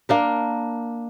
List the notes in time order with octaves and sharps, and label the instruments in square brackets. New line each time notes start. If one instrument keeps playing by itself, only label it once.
[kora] A#3 D4 A#4